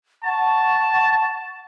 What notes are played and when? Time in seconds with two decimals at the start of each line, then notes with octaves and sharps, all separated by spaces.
0.24 F#5 A5 C#6